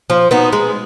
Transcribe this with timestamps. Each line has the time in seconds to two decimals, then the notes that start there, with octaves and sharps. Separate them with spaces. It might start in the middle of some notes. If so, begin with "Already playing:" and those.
0.10 F3
0.31 B3 D#4 F#4
0.53 G#3